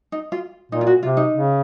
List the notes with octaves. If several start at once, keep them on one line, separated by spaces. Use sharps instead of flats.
D#4
F4
A#2 D#4
F4
F#4
C3 F4
D#4
C#3